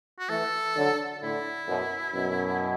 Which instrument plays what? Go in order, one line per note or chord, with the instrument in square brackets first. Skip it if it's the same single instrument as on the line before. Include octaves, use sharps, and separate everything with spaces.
[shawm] F#4
[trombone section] E3 A3 [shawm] A4
[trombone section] D3 F#3
[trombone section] A2 D3 [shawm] E4
[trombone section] F#2 B2
F#2 B2